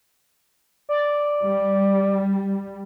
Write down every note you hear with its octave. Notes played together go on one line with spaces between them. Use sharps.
D5
G3